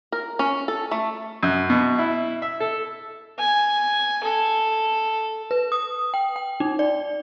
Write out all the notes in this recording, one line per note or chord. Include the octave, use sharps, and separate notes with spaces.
A#4
C#4
A4
A3
F#2
B2
E4
E5
A4
G#5
A4
B4
D#6
G5
G5
D#4
D5